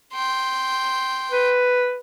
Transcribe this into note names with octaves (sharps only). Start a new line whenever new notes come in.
G5 C6
B4